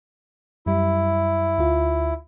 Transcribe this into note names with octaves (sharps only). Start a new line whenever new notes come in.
F#2 G3 E4
D2 F4